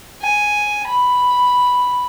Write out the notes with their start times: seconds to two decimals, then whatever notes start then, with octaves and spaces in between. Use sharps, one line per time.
0.22 G#5
0.88 B5